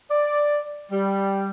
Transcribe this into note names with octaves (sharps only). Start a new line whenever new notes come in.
D5
G3